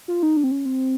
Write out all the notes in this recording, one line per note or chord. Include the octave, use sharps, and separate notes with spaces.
F4
D#4
D4
C4
C#4
C4